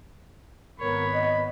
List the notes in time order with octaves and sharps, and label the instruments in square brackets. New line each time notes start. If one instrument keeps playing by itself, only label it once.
[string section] G#1 B3 [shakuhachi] A#4 [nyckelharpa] C#5 [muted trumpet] B5
[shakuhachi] D#5